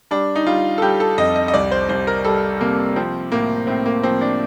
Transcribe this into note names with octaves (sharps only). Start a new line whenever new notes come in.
G3 D4
D#4
G3 F4
A4
G3 G4
A4
F2 D#5
D#5
D#5
C2 D5
C5
C2 C5
A#4
G3 A4
C3 A#3
F3 C4
A2 A#3
A2 C4
A#3
F3 C4
D4